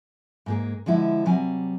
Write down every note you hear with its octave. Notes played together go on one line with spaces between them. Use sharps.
G#2 A#3 G#4
D3 F3 G#3 E4
C3 F#3 G3 G#5